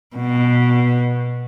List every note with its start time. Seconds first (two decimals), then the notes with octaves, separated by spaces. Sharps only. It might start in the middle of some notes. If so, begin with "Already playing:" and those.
0.16 B2